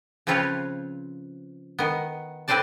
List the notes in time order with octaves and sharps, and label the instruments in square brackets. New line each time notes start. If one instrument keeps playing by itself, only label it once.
[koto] C#3 F3 C4 F4 B4 C#5
D#3 B3
A2 C4 B4 C5 D5 A5